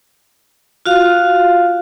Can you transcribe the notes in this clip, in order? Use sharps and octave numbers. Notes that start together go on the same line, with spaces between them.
F4 F#4 F5